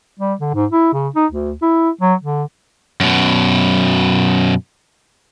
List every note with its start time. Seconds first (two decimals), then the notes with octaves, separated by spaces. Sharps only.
0.19 G3
0.40 D3
0.54 G#2
0.72 E4
0.93 C#3
1.15 D#4
1.32 D2
1.62 E4
2.01 F#3
2.22 D3
3.01 F#2 B2